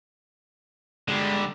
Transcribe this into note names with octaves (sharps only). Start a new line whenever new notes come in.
D3 G3 G#3